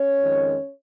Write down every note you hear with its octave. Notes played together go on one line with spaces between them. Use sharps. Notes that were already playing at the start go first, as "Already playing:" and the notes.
Already playing: C#4 C#5
F2 D#3 G#3